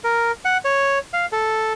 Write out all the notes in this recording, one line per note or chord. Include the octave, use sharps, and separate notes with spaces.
A#4
F#5
C#5
F5
A4